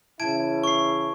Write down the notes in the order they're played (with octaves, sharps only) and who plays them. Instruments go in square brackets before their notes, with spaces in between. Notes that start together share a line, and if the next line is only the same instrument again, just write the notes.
[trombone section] C#3 E3 E4 [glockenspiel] A5 G#6 D7
[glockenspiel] C#6 C7